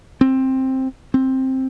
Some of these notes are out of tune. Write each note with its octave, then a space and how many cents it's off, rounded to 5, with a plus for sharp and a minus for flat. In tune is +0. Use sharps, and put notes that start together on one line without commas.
C4 +10
C4 +10